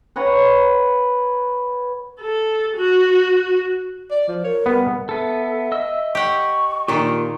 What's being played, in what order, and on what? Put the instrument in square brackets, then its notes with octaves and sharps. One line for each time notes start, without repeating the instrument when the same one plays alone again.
[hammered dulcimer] B4 C#5 F#5 A#5
[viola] A4
F#4
[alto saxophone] D5
F3
[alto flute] A#4 [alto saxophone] C#5
[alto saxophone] G3 [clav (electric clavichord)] B3
[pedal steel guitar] B3 A4 [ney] E5
[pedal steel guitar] D#5 E6
[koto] G4 F#5 [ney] C#6
[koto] A#2 D#3 [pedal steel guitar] A#3 F4 G4